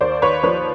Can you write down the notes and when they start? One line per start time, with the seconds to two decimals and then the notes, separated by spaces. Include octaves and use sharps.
0.01 D#2 C5 D5
0.22 D#2 B4 C#5
0.43 F3 B4 C#5